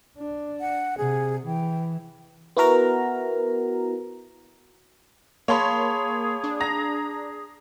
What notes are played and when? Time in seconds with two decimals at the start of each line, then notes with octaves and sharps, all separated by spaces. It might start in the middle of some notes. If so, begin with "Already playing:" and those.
0.18 D4
0.60 F#5
0.98 C3 G#4
1.47 E3 G5
2.57 B3 E4 F#4 A#4 A#5
5.48 A#3 G#4 C#5 F5 A5 B5 C6
6.44 D4
6.60 A#5 A#6